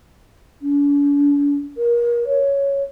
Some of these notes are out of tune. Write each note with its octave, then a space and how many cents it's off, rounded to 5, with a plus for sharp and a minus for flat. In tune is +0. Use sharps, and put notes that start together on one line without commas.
D4 -45
A#4 +30
C#5 +5